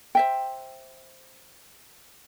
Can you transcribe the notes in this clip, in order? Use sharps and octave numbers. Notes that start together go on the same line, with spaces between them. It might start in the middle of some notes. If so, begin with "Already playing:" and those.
C5 E5 G5